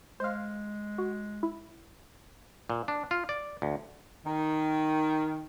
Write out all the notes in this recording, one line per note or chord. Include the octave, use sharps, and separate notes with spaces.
G#3 C5 F5
F#4
E4
A#2
D4
F4
D5
D2
D#3